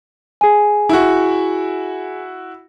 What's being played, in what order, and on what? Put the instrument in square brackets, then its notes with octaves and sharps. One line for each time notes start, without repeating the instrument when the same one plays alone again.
[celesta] G#4 G#5
[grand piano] E4 F#4